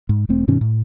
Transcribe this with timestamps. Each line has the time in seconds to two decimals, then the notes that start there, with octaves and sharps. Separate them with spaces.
0.09 G#2
0.29 E1 A3 C4
0.48 G2 B2 D#3 C#4
0.61 A2